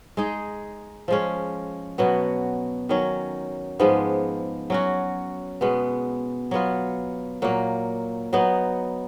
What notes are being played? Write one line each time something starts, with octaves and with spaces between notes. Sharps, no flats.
G#3 D#4 G#4
F3 G#3 C#4
B2 F#3 B3 F#4
D#3 F#3 C#4
G#2 F3 G#3 B3
F#3 C#4 F#4
B2 G#3 B3
F#3 B3 F4
A#2 F#3 A#3
F#3 B3 D#4